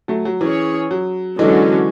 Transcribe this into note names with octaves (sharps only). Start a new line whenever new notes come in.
F#3 A3
F#3
E3 C#4 G#4 C#5
F#3
D3 E3 F#3 G#3 C#4